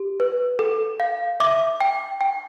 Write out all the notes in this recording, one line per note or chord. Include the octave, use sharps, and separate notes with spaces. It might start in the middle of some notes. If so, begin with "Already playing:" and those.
Already playing: G4
B4
A4
F5
E5 D6
G5
G5